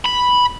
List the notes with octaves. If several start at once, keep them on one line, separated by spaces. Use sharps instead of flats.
B5